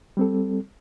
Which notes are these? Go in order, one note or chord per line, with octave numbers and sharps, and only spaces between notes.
G3 C4 A4